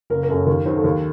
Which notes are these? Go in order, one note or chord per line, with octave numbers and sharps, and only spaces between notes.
F#1 A#4
A#4
F#2 F#3 A4
D#2 A#4
D#3 F#3 C5
A4
D#2 A#4